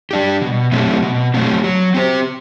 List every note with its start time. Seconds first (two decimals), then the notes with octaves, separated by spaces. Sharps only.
0.11 G3 D4 G4
0.42 B2
0.72 F#3 A3 C4 G4
1.03 B2
1.34 F#3 A3 C4 G4
1.64 F#3
1.94 C4 G4 C5